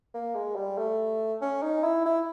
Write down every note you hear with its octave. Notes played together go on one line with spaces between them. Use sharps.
A#3
G#3
G3
A3
C#4
D#4
E4
E4